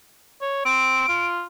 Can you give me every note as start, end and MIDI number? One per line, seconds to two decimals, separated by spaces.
0.42 0.64 73
0.65 1.04 60
0.65 1.26 98
1.09 1.45 65